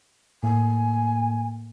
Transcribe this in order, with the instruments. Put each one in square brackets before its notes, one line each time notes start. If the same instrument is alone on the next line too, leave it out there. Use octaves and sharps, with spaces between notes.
[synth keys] A2 A#3 [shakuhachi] G#5